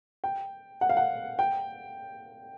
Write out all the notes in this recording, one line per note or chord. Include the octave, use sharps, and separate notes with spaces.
G5
F#5
F5
F#5
G5